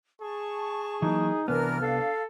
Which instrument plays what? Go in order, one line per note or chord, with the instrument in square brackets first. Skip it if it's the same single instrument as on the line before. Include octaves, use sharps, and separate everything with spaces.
[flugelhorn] G#4 [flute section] A5 C#6
[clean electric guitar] E3 F#3 A#3 [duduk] D#4
[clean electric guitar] C2 B3 [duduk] E3 [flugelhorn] D4 [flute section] A#4 F6
[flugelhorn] D4 [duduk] A4 [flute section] F5